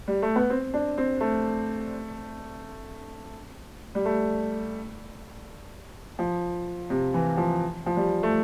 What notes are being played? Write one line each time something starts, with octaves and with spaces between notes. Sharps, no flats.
G3
A3
B3
C4
D4
C4
A3
G3
A3
F3
C3
E3
F3
F3
G3
A3